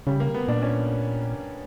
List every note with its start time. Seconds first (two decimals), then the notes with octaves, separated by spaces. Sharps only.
0.07 C#3 G3
0.20 A#3
0.34 B3
0.48 A#2 D4
0.62 C#4